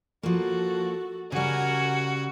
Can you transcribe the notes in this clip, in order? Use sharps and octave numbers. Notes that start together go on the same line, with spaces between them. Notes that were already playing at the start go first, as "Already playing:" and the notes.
F3 A#3 F#4 A4
C#3 G3 F#4 A#4 G#5